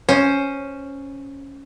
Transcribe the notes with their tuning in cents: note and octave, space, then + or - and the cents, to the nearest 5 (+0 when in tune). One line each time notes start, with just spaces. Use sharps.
C#4 +0 C5 +10